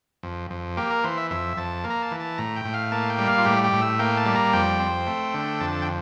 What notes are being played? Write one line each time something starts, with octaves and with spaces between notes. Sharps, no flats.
F2
F2
A#3 G4
A#4
E3 C5
E5
F2 E5
F2 A5
A#3
A#5
A5
E3
A5
A2 A#5
G5
A2
F5
A#3 A5
G5
G3
F5
F4
A2 G4
G4
A2
E5
A#3 G5
A5
G3
A#5
F2 G5
C4
A3
D3
F2 A5
G5